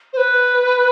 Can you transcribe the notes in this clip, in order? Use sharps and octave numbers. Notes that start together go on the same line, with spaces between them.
C5
B4